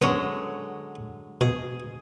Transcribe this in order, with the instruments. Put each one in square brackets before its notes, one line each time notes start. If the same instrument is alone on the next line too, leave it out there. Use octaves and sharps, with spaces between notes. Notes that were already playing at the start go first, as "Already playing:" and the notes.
[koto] D3 F#3 G#3 [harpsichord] B3 C#4
[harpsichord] B2 [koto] G#4